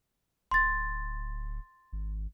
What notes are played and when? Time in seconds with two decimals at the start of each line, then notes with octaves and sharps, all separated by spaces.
0.51 D1 C6 A6
1.93 G#1